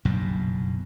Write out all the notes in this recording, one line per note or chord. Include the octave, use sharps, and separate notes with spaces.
F#1 B1 G2 A#2